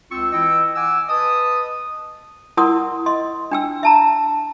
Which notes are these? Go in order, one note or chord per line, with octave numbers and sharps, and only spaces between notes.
C#2 C4 F4 C#6 E6
E3 E4 D#5 G5 E6
F#5 G#5 D6 E6
B4 D#5 A5 D#6
E4 A#4 D5 F#5 C6 D#6
D#5 C6
D4 G5 E6
E5 A5 A#5